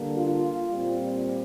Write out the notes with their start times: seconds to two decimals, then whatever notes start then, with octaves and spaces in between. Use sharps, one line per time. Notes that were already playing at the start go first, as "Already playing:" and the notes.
Already playing: D3 G3 A#3
0.16 F4
0.70 A#2 G3 C4